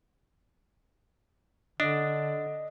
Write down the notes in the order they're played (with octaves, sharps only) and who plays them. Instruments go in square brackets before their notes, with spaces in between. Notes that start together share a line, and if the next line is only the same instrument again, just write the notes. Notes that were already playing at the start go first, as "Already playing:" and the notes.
[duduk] D3 [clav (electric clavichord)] D4 [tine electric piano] D#5